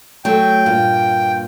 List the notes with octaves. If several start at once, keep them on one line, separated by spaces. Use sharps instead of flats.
F#3 A3 G5
G2 A#2 A#3